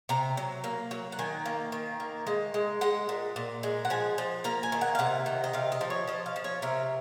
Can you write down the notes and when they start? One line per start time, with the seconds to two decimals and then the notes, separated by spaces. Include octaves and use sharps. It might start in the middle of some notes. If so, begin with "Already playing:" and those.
0.09 C3 A#5
0.37 F#3
0.64 A#3
0.91 F#3
1.12 F#5
1.19 D#3 G#5
1.46 A#3
1.72 D#3
2.00 A#3
2.27 G#3
2.54 G#3
2.81 G#3 F#5
3.09 A#2
3.36 A#2
3.63 G#3
3.85 F#5
3.90 F3 G#5
4.18 F3
4.44 A#3 A#5
4.63 G#5
4.72 D#3
4.81 F#5
4.95 F5
4.99 C3 F#5
5.26 D#3
5.44 D#5
5.53 C3 F5
5.72 D#5
5.81 F3
5.90 C#5
6.07 F3 D#5
6.26 F5
6.36 F3
6.44 C#5
6.62 C3 A#4